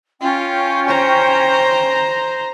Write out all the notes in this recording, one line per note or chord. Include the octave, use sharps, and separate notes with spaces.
C#4 F4 G5
C5 A#5